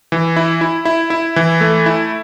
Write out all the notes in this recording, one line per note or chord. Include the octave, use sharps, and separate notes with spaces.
E3
E4
E4
E4
E4
E3
A3
E4